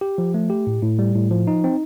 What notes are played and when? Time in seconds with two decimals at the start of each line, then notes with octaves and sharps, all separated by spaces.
0.01 G4
0.18 F3
0.34 A3
0.50 G4
0.67 A2
0.82 A2
0.99 G3
1.15 A2
1.31 F3
1.47 D#4
1.64 C4